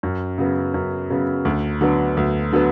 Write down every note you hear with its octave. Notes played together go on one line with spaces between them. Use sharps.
F#2
C#3 F#3 B3
F#2
C#3 F#3 B3
D2
D3 F#3 B3
D2
D3 F#3 B3